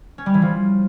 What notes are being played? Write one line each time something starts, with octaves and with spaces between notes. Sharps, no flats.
C#4
G3
E3
F3